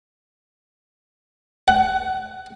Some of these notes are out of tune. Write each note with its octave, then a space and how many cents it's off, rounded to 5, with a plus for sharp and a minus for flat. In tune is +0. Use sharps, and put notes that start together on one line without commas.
F#5 +20